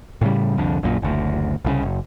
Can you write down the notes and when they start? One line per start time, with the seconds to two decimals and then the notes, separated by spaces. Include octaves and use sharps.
0.21 A2 C#3 G3
0.57 C2 F2 D3
0.83 A#1 F#2 A#2
1.02 F#1 D2
1.65 C2 A2 C#3
1.83 F#1